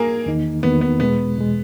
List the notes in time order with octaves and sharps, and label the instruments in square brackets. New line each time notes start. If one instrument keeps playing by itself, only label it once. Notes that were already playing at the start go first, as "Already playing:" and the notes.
Already playing: [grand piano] A#3 G#4 A#4
[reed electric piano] E2 D#3 A#3 D#4
[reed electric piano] E2 D#3 A#3 D#4 [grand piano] B3
[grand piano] B3
[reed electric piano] E2 B2 G#3 [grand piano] B3
[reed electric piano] E2 B2 G#3